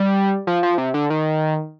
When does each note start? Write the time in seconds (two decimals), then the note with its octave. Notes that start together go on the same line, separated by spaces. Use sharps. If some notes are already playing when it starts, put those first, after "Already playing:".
Already playing: G3
0.47 F3
0.63 F3
0.78 C3
0.94 D3
1.10 D#3